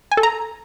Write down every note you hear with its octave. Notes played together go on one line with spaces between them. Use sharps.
G#5
A4
A#5